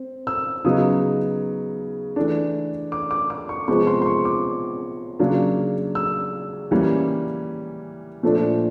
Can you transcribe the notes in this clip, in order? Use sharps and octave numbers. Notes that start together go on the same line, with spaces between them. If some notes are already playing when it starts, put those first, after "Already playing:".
Already playing: C4
E6
C#3 F#3 B3 D#4 D#6
E3 A3 D4
D6
D6
D6
C#6
C3 F3 G#3 B3 C#6
C6
C6
C#6
D6
C#3 F#3 A#3 D4
E6
E3 G3 A#3 C#4
A#2 F3 A3 D4